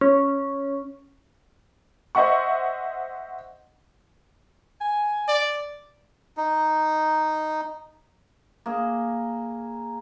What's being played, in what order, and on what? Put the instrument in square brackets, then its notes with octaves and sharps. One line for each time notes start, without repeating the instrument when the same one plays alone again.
[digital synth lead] C#4
[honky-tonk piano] C5 D#5 E5 F#5 C#6
[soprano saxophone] G#5
[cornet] D5
[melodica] D#4
[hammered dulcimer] A#3 G#4